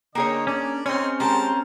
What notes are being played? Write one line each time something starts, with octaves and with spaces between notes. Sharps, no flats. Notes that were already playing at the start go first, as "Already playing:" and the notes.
D3 A#3 G#4 C#5 D#5 G5
C#4 D4 D5
C4 C#4 D#4 G#4 C#5 C6
G#3 G4 A#4 C5 A5 A#5